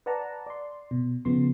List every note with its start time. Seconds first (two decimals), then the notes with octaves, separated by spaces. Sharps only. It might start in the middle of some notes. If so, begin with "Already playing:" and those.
0.06 B4 D5 F#5 A5 A#5
0.47 D5 C6
0.91 B2
1.25 C#3 F3 B3 C6